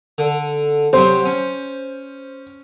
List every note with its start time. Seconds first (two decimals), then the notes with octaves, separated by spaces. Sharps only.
0.18 D3
0.93 C3 F#3 C5
1.25 C#4